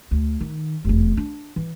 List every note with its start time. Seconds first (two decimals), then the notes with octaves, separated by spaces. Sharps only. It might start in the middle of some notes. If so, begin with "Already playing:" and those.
0.11 D2
0.41 D#3
0.85 F1 E2
1.17 D4
1.56 E3